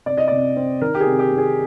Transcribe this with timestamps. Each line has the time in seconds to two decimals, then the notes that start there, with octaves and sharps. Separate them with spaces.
0.06 C3 D5
0.17 D#5
0.28 C3 D5
0.56 C4
0.81 D#3 A#4
0.95 G4
1.00 G#4
1.07 C3
1.19 G4
1.31 C3
1.38 G#4